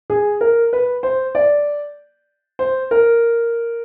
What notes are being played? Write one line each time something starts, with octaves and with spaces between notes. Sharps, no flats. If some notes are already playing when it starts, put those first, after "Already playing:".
G#4
A#4
B4
C5
D5
C5
A#4